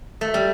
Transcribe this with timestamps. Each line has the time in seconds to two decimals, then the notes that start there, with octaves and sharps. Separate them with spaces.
0.21 A3
0.34 G3